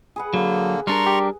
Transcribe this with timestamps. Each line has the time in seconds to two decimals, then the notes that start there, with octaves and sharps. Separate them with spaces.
0.16 G#4 B4 F#5
0.34 D3 F#3 A#3
0.87 G3 D4 A#4 A#5 C6 C#6
1.06 G4